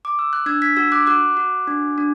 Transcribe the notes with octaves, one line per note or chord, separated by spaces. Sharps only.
D6
E6
F#6
D4 E6 G#6
G#6 B6
F#4 E6 G#6
D6 F#6
F#4 D6 F#6
F#4
D4
D4